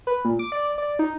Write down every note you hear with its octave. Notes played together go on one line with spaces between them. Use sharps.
B4
A#2
D6
D5
D5
D#4